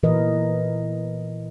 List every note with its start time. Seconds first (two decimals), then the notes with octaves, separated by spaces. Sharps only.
0.03 A#2 E3 A#4 B4 D#5